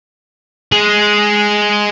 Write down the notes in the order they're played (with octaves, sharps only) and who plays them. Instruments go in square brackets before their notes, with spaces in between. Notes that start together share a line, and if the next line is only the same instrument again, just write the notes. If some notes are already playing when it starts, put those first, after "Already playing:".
[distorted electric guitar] G#3 G#4